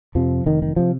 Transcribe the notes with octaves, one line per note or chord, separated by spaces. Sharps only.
F2 C3 F3
F1 D#3
D#3
C3 F3